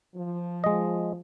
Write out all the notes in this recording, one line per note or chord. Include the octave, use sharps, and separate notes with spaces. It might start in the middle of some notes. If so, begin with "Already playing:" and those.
F3
G#3 D#5